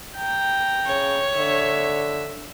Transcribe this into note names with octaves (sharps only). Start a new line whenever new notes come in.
G5 A#5
C#3 C#5
D3 E5